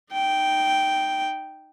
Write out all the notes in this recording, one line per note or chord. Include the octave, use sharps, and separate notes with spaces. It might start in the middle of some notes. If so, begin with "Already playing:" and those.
D#4 G5